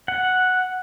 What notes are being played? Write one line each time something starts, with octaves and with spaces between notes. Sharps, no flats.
F#5